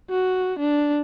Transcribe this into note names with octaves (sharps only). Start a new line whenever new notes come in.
F#4
D4